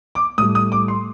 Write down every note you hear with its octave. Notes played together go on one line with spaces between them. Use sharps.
D6
A2 G3 D#6
D#6
D6
C6